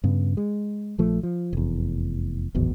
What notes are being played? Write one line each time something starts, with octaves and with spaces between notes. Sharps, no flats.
G2 C#3 B3
G#3
A#1 F3 A3
F3
F1 E2
D1 G#1 E2 B2